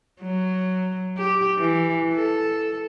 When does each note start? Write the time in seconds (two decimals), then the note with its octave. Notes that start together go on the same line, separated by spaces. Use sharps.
0.22 F#3
1.18 G4
1.58 E3
2.14 A4